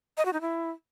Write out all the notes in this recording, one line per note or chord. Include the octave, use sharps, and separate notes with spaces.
D#5
F#4
D#4
E4